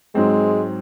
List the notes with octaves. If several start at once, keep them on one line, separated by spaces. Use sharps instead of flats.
G#2 F#3 G#3 C4